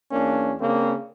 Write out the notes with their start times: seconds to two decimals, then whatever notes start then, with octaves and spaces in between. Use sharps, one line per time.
0.12 E2 A#3 C#4 D4
0.60 C#3 A#3 C4 D4